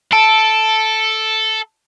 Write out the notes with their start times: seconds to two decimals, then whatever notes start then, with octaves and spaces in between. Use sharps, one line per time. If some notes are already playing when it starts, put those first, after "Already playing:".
0.12 A4 A5 D7